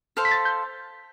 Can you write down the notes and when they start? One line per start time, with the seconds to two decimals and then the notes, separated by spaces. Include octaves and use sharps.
0.17 A4 C5 F5 F6
0.25 B6
0.31 A6
0.45 G6